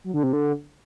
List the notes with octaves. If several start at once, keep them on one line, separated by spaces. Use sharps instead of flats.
F#3
D3
C3
D3